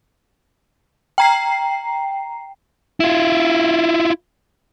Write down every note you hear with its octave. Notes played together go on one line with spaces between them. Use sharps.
G5 A#5 C7
E4 F4